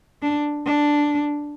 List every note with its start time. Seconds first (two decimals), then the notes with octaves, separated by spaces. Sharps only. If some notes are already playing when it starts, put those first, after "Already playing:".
0.22 D4
0.66 D4